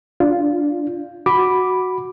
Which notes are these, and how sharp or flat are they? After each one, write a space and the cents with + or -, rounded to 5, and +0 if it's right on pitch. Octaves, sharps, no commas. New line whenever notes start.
D4 +0 F4 +0
F#4 +0 B5 +0 D6 +0